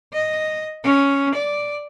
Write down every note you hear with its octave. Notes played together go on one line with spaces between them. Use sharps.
D#5
C#4
D5